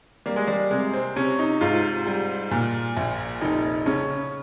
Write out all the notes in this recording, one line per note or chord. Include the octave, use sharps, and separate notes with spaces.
G3 A#3
G#3
G3
C3 G#3
C4
C3 C#4
D#4
G#2 F4
G3
A#2
A#1
F1 D#4
C#3 C#4